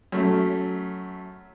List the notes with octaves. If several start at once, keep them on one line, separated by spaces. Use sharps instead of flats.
F#2 A3